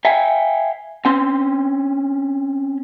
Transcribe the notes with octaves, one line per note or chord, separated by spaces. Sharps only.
E5 F5 G5 G#5
C4 C#4 C6